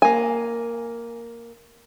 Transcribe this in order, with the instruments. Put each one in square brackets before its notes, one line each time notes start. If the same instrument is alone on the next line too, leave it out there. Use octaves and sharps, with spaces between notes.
[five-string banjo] A#3 G#5